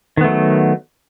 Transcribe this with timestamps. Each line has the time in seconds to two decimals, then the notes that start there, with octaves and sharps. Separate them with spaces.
0.17 D#3
0.21 B3
0.24 A3
0.28 F#3